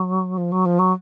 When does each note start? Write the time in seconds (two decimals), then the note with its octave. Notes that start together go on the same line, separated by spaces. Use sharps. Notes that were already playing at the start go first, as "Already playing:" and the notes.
Already playing: F#3
0.37 F3
0.52 F#3
0.66 F3
0.79 F#3